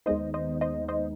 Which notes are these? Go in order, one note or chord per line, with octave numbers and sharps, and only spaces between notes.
D#2 D#3 G#3 B3 D#4 C5 D#5
C5 D#5
C5 D#5
C5 D#5